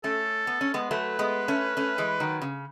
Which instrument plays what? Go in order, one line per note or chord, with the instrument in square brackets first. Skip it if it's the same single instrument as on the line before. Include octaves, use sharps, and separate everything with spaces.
[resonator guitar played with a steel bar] A3 C#4 [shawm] A4
[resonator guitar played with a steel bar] B3
C#4
G#3 B3
[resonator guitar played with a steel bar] F#3 A3 [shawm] B4
[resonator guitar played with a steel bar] G#3 B3
A3 C#4
A3 C#4
E3 G#3
D#3 F#3
C#3